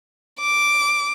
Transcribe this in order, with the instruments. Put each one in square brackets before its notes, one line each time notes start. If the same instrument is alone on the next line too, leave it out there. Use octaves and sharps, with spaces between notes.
[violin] D6